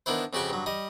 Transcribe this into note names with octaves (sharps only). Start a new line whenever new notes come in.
D#3 B3 D4 E4 C5
F2 C#3 F#4 G4 G5 C#6
G2 F#3
G3 D#5